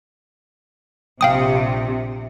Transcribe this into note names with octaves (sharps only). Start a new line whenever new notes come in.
A#1 C3 F5 G5 D#6